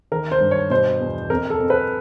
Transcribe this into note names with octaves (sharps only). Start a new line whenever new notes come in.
D#3 A#4
C5
G2
C#5
B2 C5
E2
F2 A#4
A4
F2
B4